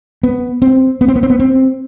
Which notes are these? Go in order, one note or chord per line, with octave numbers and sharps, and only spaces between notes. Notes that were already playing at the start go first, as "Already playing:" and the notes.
B3
C4
B3
C4
B3
C4
B3
C4